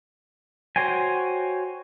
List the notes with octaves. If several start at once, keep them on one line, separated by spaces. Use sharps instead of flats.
F#4 C5 C#5 G5 G#5